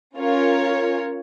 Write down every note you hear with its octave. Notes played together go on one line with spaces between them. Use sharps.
C#4 F4 A#4 C#5